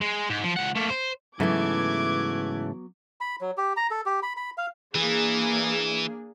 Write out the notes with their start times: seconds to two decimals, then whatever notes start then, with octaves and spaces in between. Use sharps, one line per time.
0.01 G#3
0.30 G#2
0.44 F3
0.57 C#2 F#5
0.76 A3 A#3
0.90 C5
1.40 G#2 C#3 E3 F#3 A3 B3 D6 G#6
3.21 B5
3.41 F#3
3.58 G4
3.77 A#5
3.91 A4
4.06 G4
4.23 B5
4.37 B5
4.57 F5
4.95 E3 A#3 D4 G#4